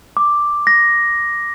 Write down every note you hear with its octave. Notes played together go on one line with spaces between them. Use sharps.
D6
A#6